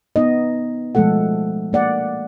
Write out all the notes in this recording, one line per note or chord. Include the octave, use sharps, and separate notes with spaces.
B3 D#4 D#5
B2 F3 G#3 A3 A4 F#5
A#3 D5 F#5